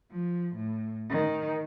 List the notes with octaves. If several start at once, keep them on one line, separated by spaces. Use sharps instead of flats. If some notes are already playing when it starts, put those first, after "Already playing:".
F3
A2
D#3